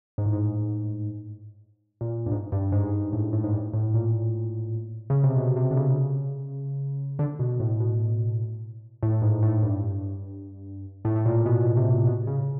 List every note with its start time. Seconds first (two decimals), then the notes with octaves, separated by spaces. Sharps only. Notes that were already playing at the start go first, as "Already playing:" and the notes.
0.18 G#2
0.26 A2
0.33 G#2
2.01 A#2
2.26 G2
2.31 G#2
2.52 G2
2.72 G#2
3.13 A2
3.33 A2
3.44 G#2
3.53 G2
3.73 A2
3.94 A#2
5.10 C#3
5.23 C3
5.36 B2
5.56 C3
5.71 D3
5.77 C#3
7.19 D3
7.39 B2
7.60 A2
7.80 B2
9.03 A2
9.22 G#2
9.43 A2
9.63 G2
11.05 A2
11.16 A2
11.26 A#2
11.46 B2
11.76 C3
12.00 C3
12.07 B2
12.27 C#3